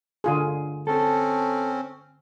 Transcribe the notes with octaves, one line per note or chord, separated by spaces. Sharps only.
D3 F4 G#4
C4 C#4 A4